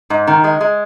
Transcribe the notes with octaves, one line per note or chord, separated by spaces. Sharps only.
G#2
D#3
G#3
G#3